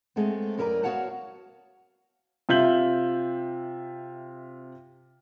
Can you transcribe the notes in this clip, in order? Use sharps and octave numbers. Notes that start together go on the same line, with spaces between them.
G#3 A3 B3 C4
F#2 E4 A#4 B4 D5 A#5
B3 F#4 C#5 F5 F#5 A5
C3 F4 E5 G6 F#7